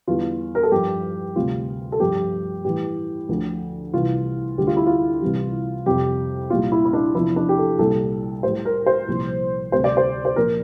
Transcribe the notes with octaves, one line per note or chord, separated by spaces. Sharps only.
E2 D3 G3 F4
A#4
A4
G2 F3 G4
D2 C3 G3 F4
A4
G2 F3 G4
A2 E3 G3 G4
D2 D3 F3
C2 C3 E3 F4
D2 D3 G3 G4
F4
E4
F4
C2 C3 E3 G3
F2 C3 G3 G4
C2 A#2 G3 F4
E4
E4
D4
E2 C3 F3 E4
D4
G4
A4
C2 A#2 G3 A4
A2 G3 C5
A#4
C5
C2 A#2 F3
D2 C3 G3 C5
D5
C5
C5
A#2 F3 A#4